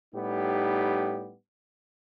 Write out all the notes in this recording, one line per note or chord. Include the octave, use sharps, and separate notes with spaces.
A2 G3 B3 D#4 G4